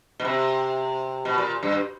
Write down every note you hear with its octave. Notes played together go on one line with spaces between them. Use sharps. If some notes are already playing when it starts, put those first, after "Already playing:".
B2
C3
B2
A#2
G2